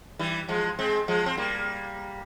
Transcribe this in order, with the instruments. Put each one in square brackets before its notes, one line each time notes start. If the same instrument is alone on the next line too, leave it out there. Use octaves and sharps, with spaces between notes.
[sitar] E3 G3
F3 G#3
G#3 C4
F3 G#3
C4
G3 A#3